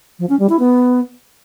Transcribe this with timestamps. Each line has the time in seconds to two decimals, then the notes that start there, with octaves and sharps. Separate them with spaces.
0.19 F3
0.29 C#4
0.39 G3
0.49 E4
0.59 B3